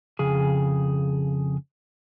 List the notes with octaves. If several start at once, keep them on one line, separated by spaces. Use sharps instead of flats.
F2 C#3 G#4